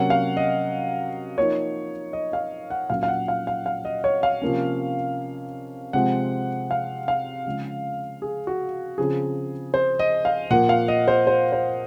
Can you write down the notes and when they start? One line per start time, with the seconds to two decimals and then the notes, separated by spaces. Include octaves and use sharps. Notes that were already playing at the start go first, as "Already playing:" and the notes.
Already playing: C3 F#3 A#3 C#4 F#5
0.10 F5
0.37 D#5
1.38 F3 A#3 D#4 C#5
2.13 D#5
2.33 F5
2.70 F#5
2.90 A#2 F#3 C#4 F5
3.03 F5
3.08 F#5
3.28 F5
3.47 F5
3.66 F5
3.85 D#5
4.04 C#5
4.23 F5
4.42 C3 F3 A#3 C#4
5.93 C3 F3 G#3 C4 F#5
6.71 F5
7.08 F5
7.46 C#3 F3 G#3
8.22 G#4
8.47 F#4
8.98 C#3 F3 C4 G#4
9.74 C5
9.99 D#5
10.25 F5
10.50 A#2 F3 A#3 F#5
10.69 F5
10.88 D#5
11.08 C5
11.27 C5
11.52 C5